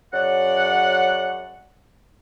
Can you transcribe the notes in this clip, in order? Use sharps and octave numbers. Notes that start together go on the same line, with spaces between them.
F#2 C#3 D5 F#5